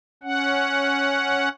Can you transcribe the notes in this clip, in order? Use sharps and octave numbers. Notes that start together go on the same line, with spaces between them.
C#4 F#5